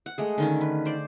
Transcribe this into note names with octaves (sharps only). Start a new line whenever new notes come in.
F#5
G#3 A3 G#4
D3 D#3 C#4
B4
C5 D5